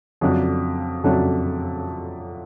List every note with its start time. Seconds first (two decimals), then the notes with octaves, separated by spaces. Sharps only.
0.21 F2 C#3 F#3 A3 D4
1.03 F2 C#3 F#3 A3 D4